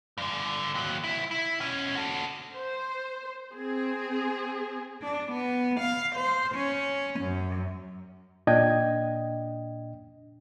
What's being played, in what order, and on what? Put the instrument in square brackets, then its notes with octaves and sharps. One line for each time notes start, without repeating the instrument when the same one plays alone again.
[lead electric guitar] G2 D3
D#2 F#3
C2 E4
E4
B2 C#4
F#4 A4
[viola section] C5
C4 G#4
[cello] D4
B3
F5
C5
C#4
F#2
[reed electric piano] A#2 D4 D#5 G5 G#6